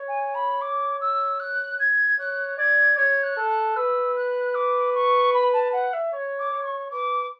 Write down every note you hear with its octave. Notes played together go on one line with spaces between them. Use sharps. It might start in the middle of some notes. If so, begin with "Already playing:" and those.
Already playing: C#5
G#5
B5
D6
E6
F#6
G#6
C#5 F#6
D5 G#6
C#5 G#6
F#6
A4
F#6
B4 E6
F#6
D6
C#6
B5
A5
F#5
E5
C#5
D6
C#5
C#6
B4 D6